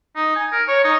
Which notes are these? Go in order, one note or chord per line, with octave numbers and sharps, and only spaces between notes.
D#4
G#5
A#4
C#5
D#4